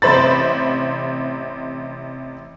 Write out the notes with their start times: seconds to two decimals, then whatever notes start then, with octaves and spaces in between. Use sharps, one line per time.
0.02 A1 C3 C5 B5 A6